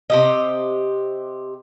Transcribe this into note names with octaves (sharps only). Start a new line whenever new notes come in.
C3 G4 D#5